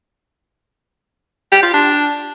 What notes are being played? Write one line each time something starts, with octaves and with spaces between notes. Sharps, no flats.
G4
F4
D4